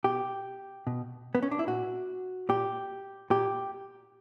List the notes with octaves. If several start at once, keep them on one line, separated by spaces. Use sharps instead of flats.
B2 G4
B2
B3
C#4
D4
E4
A#2 F#4
A#2 G4
A#2 G4